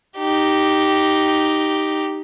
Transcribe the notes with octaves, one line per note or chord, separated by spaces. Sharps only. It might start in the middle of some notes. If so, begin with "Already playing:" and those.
D#4 G4